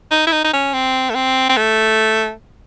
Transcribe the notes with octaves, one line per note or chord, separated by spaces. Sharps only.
D#4
E4
D#4
D#4
C#4
C4
A3
C4
C4
A3